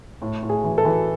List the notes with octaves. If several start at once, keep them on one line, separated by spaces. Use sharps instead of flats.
A2
A2
G#4
E3
A4
E3